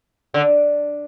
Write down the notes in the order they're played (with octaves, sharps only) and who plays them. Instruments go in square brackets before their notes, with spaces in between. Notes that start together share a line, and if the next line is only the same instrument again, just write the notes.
[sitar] D3